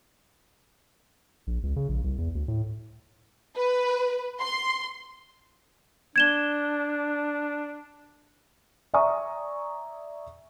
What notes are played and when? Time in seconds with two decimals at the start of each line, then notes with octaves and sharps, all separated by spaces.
1.47 A#1
1.63 C#2
1.76 C#3
1.89 A#1
2.04 C2
2.18 E2
2.35 D2
2.48 A2
3.58 B4
4.40 C6
6.16 D4 G#6 E7 G7
8.94 D5 E5 G#5 A#5 C#6 D#6